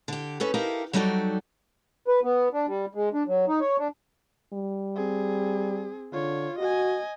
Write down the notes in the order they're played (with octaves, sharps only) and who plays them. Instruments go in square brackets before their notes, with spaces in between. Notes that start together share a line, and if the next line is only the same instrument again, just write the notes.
[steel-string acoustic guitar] D3 G4
C#4 A4 B4
D#4 E4 G4 A4 A#4 F5
F#3 G3 D#4 F#4 A4 D5
[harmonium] B4
B3
D4
G3
G#3
D4
F#3
D#4
C#5
D4
[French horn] G3
[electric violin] C4 G#4
[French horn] D3 [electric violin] F4 C#5
[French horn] F#4 [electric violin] D#5 G#5